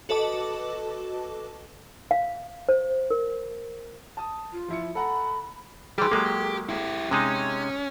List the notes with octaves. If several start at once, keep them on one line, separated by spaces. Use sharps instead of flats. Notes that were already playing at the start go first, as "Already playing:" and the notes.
F#4 A4 B4 D#5 A5 D6
F5
C5
A#4
A5 D#6
F4
F3 E4 C#7
A4 F#5 A#5 B5
E3 G3 G4 G#4 C6
F#3 G#3 A#3 A4
E4 G4
C3 G#3 C#4 D#4